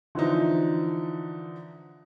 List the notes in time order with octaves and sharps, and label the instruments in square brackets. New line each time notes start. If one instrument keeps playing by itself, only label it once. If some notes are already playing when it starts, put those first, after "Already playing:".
[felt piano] D3 E3 F3 D#4